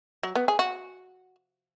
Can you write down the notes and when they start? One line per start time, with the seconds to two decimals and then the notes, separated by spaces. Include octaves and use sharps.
0.23 F#3
0.35 B3
0.48 G#4
0.59 F#4